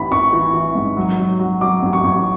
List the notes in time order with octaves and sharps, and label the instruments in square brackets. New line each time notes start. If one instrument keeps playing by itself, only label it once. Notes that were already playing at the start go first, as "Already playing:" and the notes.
Already playing: [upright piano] A1 E3 B5
A1 C#6
E3
E3
G#2
F#3
F#3
F#3
F#3 D6
A1
C#6
A1